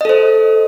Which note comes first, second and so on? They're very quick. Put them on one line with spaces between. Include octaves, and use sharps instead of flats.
D#5 A4 C5